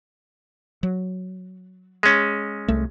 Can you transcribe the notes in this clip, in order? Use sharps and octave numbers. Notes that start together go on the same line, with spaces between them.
F#3
G#3 C#4
C2 A3